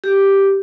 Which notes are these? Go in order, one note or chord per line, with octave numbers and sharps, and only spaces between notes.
G4